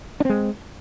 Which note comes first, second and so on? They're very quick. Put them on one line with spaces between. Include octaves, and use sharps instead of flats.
D4 C4 G#3